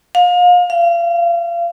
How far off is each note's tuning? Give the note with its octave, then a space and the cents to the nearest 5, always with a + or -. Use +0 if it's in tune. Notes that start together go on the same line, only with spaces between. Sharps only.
F5 +35
F5 -35